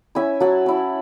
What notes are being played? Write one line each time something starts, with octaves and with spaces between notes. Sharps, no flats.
C#4 E4 E5 G#5
F#3 F#5 A5
C#4 E4